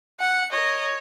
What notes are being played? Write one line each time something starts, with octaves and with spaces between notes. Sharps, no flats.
F#5 C#7
A#4 C#5 D#5